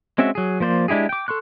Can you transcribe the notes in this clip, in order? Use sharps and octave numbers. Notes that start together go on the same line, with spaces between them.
G#3 C4 C#4 F#4 E5
F#3 G#4
F3 A#3 C5 D5
G#3 D4 E4 G4 G#4
G5 D6
A4 C6 C#6 F#6